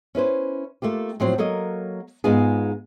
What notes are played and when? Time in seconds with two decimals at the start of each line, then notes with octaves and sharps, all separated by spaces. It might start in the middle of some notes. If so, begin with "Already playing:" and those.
0.15 C#4 E4 B4 C5
0.82 A3 A#3 F4 G4
1.20 A2 F3 F#3 C4 C5
1.38 F#3 A#3 A4 A#4 D#5
2.24 G#2 G#3 B3 F4 G#4